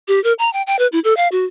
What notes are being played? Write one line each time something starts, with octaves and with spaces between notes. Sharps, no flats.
G4
A#4
A#5
G5
G5
B4
E4
A4
F5
F#4